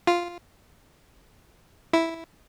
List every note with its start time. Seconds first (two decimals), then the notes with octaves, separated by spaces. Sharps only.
0.07 F4
1.93 E4